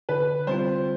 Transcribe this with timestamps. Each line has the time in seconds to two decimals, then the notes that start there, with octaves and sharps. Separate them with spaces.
0.09 D3 B4
0.47 G3 C4 F4 C5